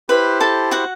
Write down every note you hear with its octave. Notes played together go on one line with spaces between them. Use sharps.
E4 G4 B4 C5 B5
A4 A5
F#4 F#5